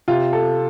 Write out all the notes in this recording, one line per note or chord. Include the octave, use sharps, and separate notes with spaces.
C3 F4
A4